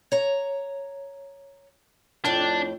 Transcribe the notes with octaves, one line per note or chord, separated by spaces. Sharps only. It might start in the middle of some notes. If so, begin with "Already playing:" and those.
C#5 A#5
F2 A2 D4 G5